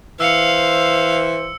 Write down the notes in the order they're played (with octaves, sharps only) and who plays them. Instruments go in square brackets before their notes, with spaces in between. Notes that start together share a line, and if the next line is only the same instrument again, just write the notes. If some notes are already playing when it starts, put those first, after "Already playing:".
[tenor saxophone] E3 [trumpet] C5 [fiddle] F5 [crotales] E6 C#7